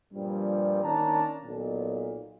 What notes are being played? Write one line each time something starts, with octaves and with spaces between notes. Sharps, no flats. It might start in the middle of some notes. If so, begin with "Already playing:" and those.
G2 A#2 F3 G3
D#3 A#3 C#4 D4 A5 A#5
B1 A#2